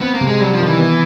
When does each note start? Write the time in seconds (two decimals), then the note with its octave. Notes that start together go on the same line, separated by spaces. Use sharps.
0.01 B3 C4
0.14 A#3
0.21 C3
0.27 G#3
0.40 F#3 G3
0.53 F3
0.60 D#3
0.66 E3
0.79 B3